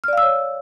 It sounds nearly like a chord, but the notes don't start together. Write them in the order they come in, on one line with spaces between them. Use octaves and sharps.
F6 D5 F5 E6 C#5